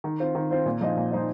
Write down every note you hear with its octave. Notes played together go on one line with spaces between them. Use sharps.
D#3
C4 F4 C5
D#3
C4 F4 C5
A#2
F3 D#4 C5 D#5
A#2
F3 D#4 C5 D#5